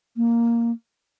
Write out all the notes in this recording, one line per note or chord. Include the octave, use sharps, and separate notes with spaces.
A#3